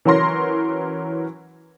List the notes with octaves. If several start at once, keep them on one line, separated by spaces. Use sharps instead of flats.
E3 F#3 C#4 A#4 C6 A#6